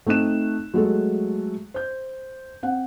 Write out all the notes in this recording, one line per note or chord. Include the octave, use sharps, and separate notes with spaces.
A3 C4 D#4 F#6 E7
F#3 G#3 A3 A4
C5 G6
C4 F#5